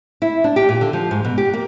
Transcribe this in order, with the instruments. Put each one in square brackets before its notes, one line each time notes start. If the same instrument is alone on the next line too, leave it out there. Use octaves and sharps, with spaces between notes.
[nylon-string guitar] E4
D4
G4
A#2
D3
F3
G#2
B2
G4
A#3